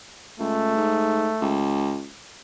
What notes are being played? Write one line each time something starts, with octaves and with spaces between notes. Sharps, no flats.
C#2 A3
G#2
C#2